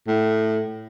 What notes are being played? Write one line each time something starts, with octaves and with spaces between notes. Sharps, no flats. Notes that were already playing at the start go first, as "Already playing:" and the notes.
A2